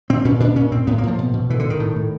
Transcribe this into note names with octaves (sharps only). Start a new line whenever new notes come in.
A#2 C4
A#2 C#4
A#2 D4
A#2 C#4
A#2 C4
A2 B3
A#3
A2 F3
B2
B2
A2 E3
D3
A2
D#3
A2
A2